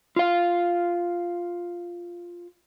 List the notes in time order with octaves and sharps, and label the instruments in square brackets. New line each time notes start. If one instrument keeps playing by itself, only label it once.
[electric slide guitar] F4 F5